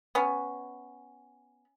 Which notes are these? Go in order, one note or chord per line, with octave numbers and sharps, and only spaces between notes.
B3 C#4